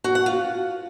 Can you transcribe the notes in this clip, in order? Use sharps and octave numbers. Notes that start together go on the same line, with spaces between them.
F#4
F#5
F4